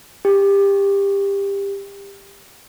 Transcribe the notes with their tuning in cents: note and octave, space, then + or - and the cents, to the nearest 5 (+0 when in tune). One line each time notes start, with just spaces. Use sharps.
G4 +20